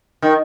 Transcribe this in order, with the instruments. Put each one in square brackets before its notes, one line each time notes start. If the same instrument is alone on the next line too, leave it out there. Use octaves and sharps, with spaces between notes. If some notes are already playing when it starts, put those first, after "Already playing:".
[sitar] D#3